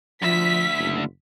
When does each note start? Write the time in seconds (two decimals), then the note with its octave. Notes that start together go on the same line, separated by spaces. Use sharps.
0.22 D2 F3 E5 B6
0.79 F#1